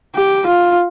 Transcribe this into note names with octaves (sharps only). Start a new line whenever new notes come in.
G4
F4